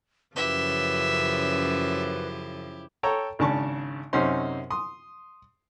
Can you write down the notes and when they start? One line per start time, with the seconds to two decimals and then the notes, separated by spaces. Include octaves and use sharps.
0.36 F#2 C#3 F3 E4 G4 B4 E5
3.03 A4 C#5 G5 A#5
3.39 G#1 C#3 D4 A5 C#6
4.13 F#2 C3 C#4 D#4 C5 C6
4.71 C6 D#6